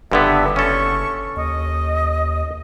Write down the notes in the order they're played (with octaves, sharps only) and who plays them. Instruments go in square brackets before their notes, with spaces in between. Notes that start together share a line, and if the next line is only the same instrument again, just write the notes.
[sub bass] F#1 [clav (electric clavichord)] G2 D3 B3 [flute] E5
[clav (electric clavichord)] C#4 A4 [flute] C#6
[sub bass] D#2 [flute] D#5